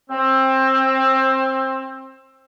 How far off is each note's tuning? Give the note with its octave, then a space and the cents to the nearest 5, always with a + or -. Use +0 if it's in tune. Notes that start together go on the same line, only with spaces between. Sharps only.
C4 +20